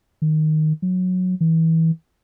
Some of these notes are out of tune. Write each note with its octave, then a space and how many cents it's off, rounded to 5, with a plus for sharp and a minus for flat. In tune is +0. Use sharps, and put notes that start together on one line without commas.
D#3 -5
F#3 -15
E3 -25